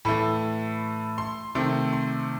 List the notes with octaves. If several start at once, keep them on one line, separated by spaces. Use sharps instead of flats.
A2 E3 A3 B5
C6
C3 D#3 A3 C6
C6